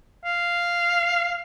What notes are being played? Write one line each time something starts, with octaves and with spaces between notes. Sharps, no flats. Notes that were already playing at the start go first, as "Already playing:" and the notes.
F5